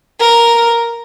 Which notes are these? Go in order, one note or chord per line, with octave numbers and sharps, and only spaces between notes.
A#4